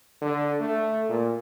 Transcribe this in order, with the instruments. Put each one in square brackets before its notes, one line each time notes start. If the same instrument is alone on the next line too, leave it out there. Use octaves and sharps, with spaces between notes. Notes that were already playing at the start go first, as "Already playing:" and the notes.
[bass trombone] D3
A3
A#2